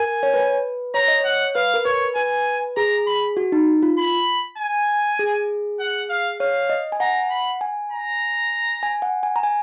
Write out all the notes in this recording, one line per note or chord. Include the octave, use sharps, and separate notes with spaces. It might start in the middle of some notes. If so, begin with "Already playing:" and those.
Already playing: A#4 G#5
C#5
B4
C#5 A#5
D#5
C#5 F#5
B4 F5
A#4
B4 C#5
B4 G#5
G#4 A#5
B5
F#4
D#4
F4
B5
G#5
G#4
F#5
F5
C#5 F5
D#5
G#5
F#5 A#5
B5
G#5
A#5
G#5
F#5
G#5
A#5
G#5